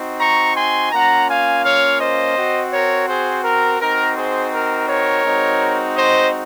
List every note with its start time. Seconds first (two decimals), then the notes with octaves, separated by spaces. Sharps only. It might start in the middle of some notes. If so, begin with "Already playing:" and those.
Already playing: C4 D#4 F#4
0.20 A#5 C#6
0.56 G#5 C6
0.92 A#3 C#4 F4 F#5 A#5
1.28 F5 G#5
1.64 C#5 F5
2.00 C5 D#5
2.36 C4 F#4
2.73 A#4 C#5
3.09 G#4 C5
3.44 A#4
3.80 C4 D#4 F#4 A#4
4.16 G#4 C5
4.52 A#4
4.88 A#4 C#5
5.24 G#3 C4 D#4 F#4
5.96 C5 D#5